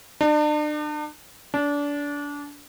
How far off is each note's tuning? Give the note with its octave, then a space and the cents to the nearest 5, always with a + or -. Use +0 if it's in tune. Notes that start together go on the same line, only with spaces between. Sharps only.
D4 +40
D4 -25